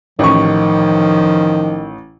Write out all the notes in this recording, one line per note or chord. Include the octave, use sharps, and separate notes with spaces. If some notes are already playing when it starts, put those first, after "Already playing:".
A1 D#3 F3 C#6